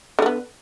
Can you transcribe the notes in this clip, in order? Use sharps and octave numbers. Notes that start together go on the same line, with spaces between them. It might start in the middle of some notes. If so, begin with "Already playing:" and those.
D3 A3 B3